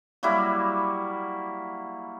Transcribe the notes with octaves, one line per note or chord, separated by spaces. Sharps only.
F#3 G3 A#3 E4